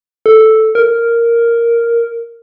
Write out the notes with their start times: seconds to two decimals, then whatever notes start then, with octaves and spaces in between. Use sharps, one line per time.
0.26 A4
0.75 A#4